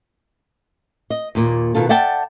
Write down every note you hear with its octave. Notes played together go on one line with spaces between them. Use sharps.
D#5
D#2 A#2
B2 D#3 F4 A4
D5 E5 F#5 G5 A5